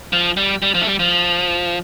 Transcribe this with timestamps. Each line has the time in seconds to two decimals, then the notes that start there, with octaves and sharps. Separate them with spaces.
0.13 F3
0.37 G3
0.62 G3
0.74 F3
0.82 A3
0.87 G3
0.99 F3